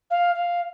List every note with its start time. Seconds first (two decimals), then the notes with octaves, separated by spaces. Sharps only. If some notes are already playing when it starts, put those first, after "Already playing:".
0.10 F5
0.35 F5